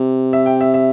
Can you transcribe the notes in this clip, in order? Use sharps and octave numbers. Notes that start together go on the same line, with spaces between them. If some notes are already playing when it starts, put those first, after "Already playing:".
Already playing: C3
E5
G5
E5
E5